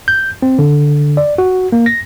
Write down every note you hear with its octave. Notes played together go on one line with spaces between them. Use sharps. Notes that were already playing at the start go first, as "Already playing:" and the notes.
G6
C4
D3
D5
F#4
A#3
A#6